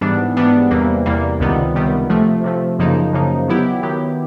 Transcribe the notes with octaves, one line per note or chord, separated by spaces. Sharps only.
G#2 E3 G3 B3 D4
G#2 E3 G3 B3 D4
E2 C3 E3 G3 A#3
E2 C3 E3 G3 A#3
C#2 C3 D#3 G3 B3
C#2 C3 D#3 G3 B3
C3 F3 A3
C3 F3 A3
F#2 C#3 F3 A#3 D#4
F#2 C#3 F3 A#3 D#4
D#3 F#3 B3 E4 G4
D#3 F#3 B3 E4 G4